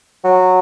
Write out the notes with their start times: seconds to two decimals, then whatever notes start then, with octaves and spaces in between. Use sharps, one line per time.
0.24 F#3